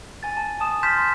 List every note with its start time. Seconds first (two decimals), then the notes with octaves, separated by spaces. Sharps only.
0.23 G#5 A6
0.37 A5
0.60 A5 D#6 E7
0.83 C6 F6 G6 A6 B6 E7